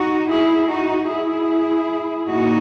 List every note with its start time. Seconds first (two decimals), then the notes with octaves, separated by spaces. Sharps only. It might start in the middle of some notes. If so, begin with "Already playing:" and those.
Already playing: D#4 F#4
0.29 E4 G#4
0.69 D#4 F#4
1.09 E4 G#4
2.29 A#2 D#4 F#4